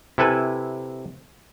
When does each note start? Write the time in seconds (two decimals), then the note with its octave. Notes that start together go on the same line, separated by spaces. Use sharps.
0.18 C3 E4 A4 B4 G#5